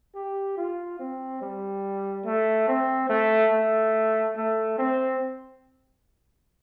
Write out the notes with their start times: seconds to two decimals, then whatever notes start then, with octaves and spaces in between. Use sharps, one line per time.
0.15 G4
0.57 F4
0.99 C4
1.42 G3
2.25 A3
2.68 C4
3.09 A3
3.52 A3
4.36 A3
4.78 C4